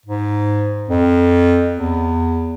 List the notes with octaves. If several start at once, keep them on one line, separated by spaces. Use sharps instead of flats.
G#2
F2
E2